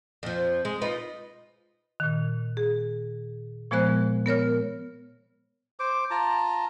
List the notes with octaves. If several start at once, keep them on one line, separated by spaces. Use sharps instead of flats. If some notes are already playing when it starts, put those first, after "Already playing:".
F2 F3
G#3
D#4 F4 B4
A#2 D#3
G#4
A#2 F3 G#3 B3 C5 F#6
B3 A#4 C#5 F6
C5 D6
F4 A5 A#5